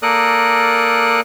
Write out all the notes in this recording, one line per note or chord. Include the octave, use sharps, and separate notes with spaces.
A#3 A4 A#4 D5 D#6 F#6